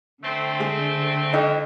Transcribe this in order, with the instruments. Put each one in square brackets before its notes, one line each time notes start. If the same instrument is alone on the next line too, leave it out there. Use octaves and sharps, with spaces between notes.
[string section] D3 [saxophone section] A3 C4
[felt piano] G#3 G#4
[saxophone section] F2 [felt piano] D#4 D#5 G5